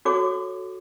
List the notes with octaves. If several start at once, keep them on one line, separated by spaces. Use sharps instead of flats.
F#4 A4 C#5 D6